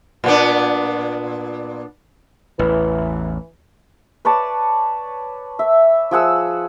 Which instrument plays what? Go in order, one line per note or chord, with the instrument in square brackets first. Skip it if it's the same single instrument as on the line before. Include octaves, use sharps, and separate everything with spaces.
[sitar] A#2 B3 D4
[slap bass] A1 E2 [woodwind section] E3
[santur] B4 C#5 D5 A5
E5
F3 G#4 F#5 E6